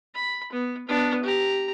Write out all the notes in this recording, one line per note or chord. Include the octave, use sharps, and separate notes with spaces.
B5
B3
B3 D4
G4 A#5